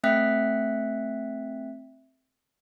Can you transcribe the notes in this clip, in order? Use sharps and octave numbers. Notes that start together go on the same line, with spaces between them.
A3 C4 E5 G5 F#6 B6